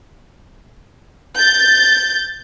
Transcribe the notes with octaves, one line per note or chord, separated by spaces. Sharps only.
G6 A6